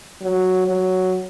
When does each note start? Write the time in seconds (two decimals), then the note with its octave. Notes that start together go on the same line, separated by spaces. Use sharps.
0.22 F#3
0.66 F#3